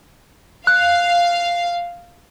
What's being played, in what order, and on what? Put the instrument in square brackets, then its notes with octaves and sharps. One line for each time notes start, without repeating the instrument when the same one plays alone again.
[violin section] F5 [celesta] F#6